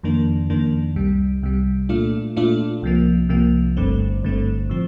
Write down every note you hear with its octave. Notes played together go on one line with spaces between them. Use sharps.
F2 D#3 A#3 D4
F2 D#3 A#3 D4
C2 C3 G3
C2 C3 G3
A#2 A3 D4 F4
A#2 A3 D4 F4
C2 C3 F3 A#3
C2 C3 F3 A#3
G1 G2 D3 A3 C4
G1 G2 D3 A3 C4
A2 F3 C4